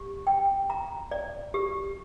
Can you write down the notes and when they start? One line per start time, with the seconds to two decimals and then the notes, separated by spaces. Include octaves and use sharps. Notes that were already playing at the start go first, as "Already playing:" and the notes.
Already playing: G4
0.27 G5
0.70 A#5
1.11 D5
1.54 G4